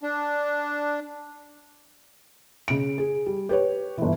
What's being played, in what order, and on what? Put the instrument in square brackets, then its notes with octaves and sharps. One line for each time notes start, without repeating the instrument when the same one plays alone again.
[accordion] D4
[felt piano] C#3 D7
G#4
G3
G4 B4 C#5
G1 E3